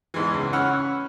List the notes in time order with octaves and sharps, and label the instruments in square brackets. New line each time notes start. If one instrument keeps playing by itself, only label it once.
[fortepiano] E2 G#2 E3
C#2
C#4 F#5 B5 E6 F6